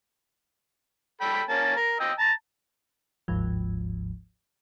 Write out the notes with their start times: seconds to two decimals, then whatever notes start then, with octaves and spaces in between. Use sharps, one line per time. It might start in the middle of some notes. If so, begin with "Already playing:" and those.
1.21 A4 G5 B5
1.49 A#3 C#4 A5
1.76 A#4
2.00 D#5 G5 E6
2.19 A5 A#5
3.28 G1 D2 G#2 F3